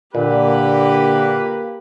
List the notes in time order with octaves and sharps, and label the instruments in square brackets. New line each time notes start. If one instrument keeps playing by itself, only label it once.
[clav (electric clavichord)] A#2 [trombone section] D3 [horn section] A#3 B4 [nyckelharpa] G4